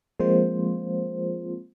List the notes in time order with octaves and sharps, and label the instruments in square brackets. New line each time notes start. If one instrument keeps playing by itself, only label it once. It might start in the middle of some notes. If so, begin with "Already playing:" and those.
[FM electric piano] F3 G#3 A#3 C4 F4 C5